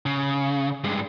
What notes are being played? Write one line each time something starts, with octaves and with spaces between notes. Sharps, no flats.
C#3
G2 G#3